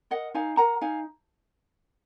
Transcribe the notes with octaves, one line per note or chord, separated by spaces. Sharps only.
A#4 D#5 F#5
D#4 F5 G#5
A#4 F#5 A#5
D#4 F5 G#5